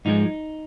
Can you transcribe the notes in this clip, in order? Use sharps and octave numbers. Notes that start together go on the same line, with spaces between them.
G#2 F3 G#3 D#4